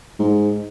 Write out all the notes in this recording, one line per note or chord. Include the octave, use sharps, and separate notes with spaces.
G#2